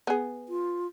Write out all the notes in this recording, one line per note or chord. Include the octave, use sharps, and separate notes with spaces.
B3 G#4
F4